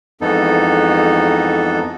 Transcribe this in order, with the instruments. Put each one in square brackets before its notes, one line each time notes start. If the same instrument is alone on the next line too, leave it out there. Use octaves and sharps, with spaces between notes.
[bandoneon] F2 G#2 E3 B3 D#4 A4